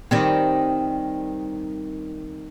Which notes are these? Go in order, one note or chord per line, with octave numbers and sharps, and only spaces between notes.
D#3 G3 C4